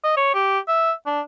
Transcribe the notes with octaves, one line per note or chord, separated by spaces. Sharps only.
D#5
C#5
G4
E5
D4